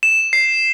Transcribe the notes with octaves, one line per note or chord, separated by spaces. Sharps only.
E7
C7